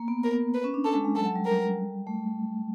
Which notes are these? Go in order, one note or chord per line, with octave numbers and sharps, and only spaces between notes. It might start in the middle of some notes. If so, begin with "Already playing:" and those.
Already playing: A#3
B3
B3 A#4
B4
C#4
D4
D4 A4
G#3
G#3
F#3 A4
F#3
G3
A#4
A3